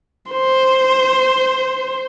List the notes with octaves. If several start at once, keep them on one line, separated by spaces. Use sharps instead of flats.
C5